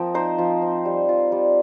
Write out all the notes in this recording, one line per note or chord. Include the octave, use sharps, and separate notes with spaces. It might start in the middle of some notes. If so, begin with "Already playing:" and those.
Already playing: F3 A#3 C4 F4 D#5 G5
D#4 C5
F3
C4
G3
F4
G3